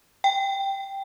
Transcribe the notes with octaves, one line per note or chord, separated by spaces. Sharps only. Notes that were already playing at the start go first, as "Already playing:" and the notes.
G5